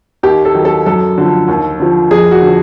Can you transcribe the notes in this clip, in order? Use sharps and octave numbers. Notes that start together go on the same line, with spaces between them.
D#2 G4
A4
D#3 F#3
A4
F#2 A4
D3 F3
D#2
D3 F3
F2 G#4
F#4
D3 F3